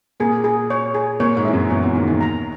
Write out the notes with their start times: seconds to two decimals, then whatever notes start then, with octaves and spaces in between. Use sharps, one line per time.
0.20 A#2 A#3 G#4
0.44 G#4
0.70 C#5
0.95 G#4
1.20 A#2 A#3 C#5
1.37 G#2 G#3
1.45 E3 E5
1.53 F#2 F#3
1.70 E2 E3 C#5
1.83 E2 E3
1.95 D#2 D#3 D#4
2.07 D#2 D#3
2.21 A#5